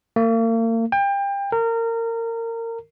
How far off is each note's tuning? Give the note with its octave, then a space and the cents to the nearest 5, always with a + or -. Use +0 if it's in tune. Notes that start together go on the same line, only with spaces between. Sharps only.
A#3 -40
G5 +30
A#4 -25